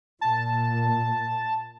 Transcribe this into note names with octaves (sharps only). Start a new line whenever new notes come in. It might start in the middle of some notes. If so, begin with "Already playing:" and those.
A#2 A5